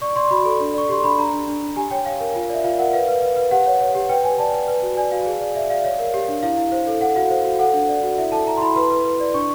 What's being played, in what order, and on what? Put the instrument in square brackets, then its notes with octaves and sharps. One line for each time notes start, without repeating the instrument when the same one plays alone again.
[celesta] D5 C#6
D5 C6
F#4 B5
A4
D4
D5 C#6
G4 C6
D4 B5
D4 A#5
D4
D4
D4
G4 G#5
C#5 G5
C#5 F5
A#4
F4
D5 E5
F4 F5
A#4 F#5
B4 F5
B4
B4
B4
G4 F#5
C#5
C#5
G4
B4 G5
B4 G#5
D5 A5
B4
B4
F#4
D5 G#5
F#4 F5
G#4
D5
D5 E5
D5 F5
C#5 F5
A#4
G4
D4
E4 F5
E4
C5
A4
A4 F#5
F#4 F5
C5
F#4
A4 F#5
D4
D5
F#4
E4 E5
A4 A5
E4 A#5
C6
E4 B5
B4 C6
B4
B4
D5
D4 C#6